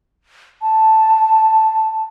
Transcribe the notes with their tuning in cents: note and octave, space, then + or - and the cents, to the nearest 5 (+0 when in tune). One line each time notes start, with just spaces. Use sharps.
A5 +0